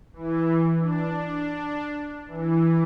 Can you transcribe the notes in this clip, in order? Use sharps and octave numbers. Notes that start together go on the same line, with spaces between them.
E3
D4
E3